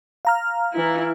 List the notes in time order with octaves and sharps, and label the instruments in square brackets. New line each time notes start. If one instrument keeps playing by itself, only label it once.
[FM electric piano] F5 A#5 F6
[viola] E3 E4